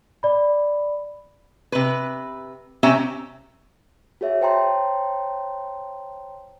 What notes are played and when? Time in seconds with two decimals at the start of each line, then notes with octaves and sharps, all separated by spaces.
0.23 D5 B5
1.72 C3 B4
2.83 C3 C4 C#4 G4 E5 A#5
4.21 F#4 G#4 C#5 E5
4.41 C5 C#5 G5 A5 A#5 C6